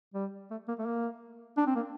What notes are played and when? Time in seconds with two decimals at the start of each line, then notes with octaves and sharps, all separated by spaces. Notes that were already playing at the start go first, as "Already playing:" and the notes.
0.14 G3
0.51 A3
0.68 A#3
0.79 A3
0.86 A#3
1.57 D4
1.67 C4
1.76 A#3